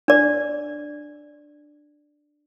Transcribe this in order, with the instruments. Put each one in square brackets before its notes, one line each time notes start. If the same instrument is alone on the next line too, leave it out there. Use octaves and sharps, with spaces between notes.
[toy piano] D4 D5